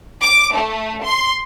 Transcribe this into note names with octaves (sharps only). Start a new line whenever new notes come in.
D6
A3
C6